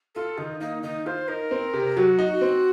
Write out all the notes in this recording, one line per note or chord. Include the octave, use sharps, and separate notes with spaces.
F4 A4
D#3 D#4
A#3 D#4
D#3 D#4
F4 C5
D#4 A#4
C4
C3
F#3 F#4
D#4
C4